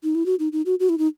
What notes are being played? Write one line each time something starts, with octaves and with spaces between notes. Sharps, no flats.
D#4
E4
F#4
D#4
D#4
F#4
F#4
E4
D#4